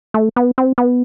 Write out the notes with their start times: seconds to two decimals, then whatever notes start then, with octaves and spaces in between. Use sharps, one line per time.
0.14 A3
0.36 B3
0.58 C4
0.78 B3